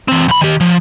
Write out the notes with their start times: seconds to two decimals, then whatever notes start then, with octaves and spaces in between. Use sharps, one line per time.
0.08 E3 C4
0.28 B1 B5
0.42 D#3 G4
0.61 F3